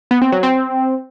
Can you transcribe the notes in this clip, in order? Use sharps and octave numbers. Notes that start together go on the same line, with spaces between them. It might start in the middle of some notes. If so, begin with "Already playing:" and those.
B3
C4
F#3
C4